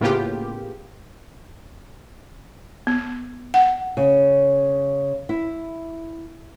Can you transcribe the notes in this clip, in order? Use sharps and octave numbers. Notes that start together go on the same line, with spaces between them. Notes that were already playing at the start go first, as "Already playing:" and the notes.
A2 C#3 A#3 B3 F4 G4
B3
F#5
C#3
E4